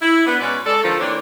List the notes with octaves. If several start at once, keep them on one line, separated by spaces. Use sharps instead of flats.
E4
B3 D4
B2 G#3 C#4 B4 D5
G#3 A4 D5
D3 D#3 F3 A4
E3 A#3 C4 D4 B4 C#5